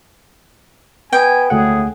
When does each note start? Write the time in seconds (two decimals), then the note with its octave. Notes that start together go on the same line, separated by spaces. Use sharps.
1.13 B3 G5 G#5
1.50 D2 A2 G#4 F#5